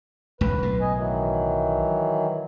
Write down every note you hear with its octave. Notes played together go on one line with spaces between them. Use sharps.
E1 C#2 G2 B4
B1 A2
D#5 G#5
D#3 E3 F#3